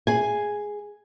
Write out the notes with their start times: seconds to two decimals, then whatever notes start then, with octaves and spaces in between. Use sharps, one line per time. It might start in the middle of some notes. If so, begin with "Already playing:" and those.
0.07 G#4 G#5